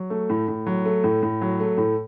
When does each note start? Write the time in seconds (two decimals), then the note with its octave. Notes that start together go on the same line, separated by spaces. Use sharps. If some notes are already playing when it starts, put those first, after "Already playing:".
Already playing: F#3
0.10 A3
0.30 A2
0.48 A2
0.67 F#3
0.85 A3
1.04 A2
1.23 A2
1.41 F#3
1.60 A3
1.78 A2